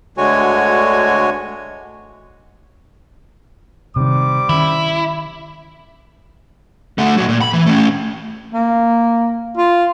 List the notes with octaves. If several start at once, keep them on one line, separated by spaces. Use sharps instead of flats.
D2 D3 G#3 F#4 C#5 G#5
C3 D#3 G3 C5 D6
D#3 C#4 E4
D3 A3
A#2 F#3
A#2
B5
E3
A3 C#4
A#3
F4